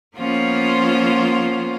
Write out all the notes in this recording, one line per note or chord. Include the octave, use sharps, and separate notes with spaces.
F3 A#3 B3 C#4 F4 C5